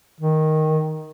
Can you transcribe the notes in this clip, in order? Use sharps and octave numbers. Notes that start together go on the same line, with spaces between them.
D#3